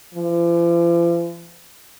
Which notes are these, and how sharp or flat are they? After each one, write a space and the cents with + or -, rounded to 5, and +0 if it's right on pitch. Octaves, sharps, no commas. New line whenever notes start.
F3 -45